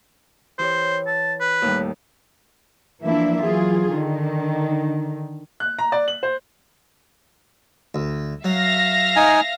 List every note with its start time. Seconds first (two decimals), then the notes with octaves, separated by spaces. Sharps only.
0.58 E3 G4 C5 C#5
1.07 A5
1.40 B4
1.62 D#2 A2 G3
3.02 E3 F3 A#3 D4 E4 E5
3.41 E3 F#3 F4 G#4
3.92 D3 D#3
5.60 F#6
5.79 A#5
5.92 D5
6.08 F#7
6.23 C5
7.95 D2
8.44 F#3 E5 F5 A#6
9.16 D#4 G#5